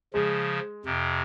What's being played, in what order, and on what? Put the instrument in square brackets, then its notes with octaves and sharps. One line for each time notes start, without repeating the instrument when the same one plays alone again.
[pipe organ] C#3 F3 [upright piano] G#3
[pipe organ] F2 C3